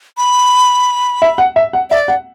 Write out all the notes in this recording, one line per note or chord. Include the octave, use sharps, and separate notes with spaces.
B5
E5
F#5
E5
F#5
D5 E5
F#5